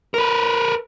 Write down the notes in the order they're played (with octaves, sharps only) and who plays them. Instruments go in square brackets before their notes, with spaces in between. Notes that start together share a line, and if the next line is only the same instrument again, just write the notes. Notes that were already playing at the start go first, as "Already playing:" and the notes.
[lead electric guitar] A#4 B4